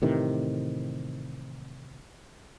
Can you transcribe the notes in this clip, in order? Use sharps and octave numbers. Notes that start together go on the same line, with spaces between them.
A2 C3 D#3 E3